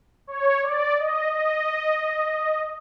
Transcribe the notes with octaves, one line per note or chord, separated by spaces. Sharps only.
C#5
D5
D#5
D#5